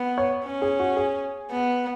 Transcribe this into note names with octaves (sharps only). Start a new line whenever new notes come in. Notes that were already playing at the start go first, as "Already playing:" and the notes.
Already playing: B3
C#5
C#4
G#4
F#4
G#4
B3